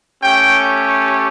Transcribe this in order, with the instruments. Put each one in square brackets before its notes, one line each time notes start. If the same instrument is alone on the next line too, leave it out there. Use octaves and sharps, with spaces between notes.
[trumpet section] A3 C#4 G4 G5